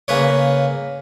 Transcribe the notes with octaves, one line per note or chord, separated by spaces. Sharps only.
C#3 A#3 B4 C#5